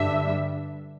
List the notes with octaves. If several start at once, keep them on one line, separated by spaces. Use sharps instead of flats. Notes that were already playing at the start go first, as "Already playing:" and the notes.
Already playing: G2 D3 G3 D4 E5